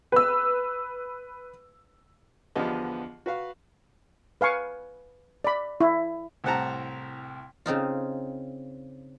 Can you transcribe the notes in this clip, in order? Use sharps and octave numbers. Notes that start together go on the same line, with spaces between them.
B4 E6
E2 D3 F3 B3 G4 D#5
F#4 B4 F5
B4 F5 G#5 C#6
D5 B5
E4
C2 A2 C4 F#5 A5 A#5
C#3 C4 D#4 F4